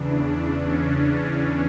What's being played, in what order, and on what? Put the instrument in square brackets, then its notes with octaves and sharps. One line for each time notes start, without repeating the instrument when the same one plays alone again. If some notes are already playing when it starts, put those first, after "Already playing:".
Already playing: [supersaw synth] E2 C#3 E3 D4
D4
C#4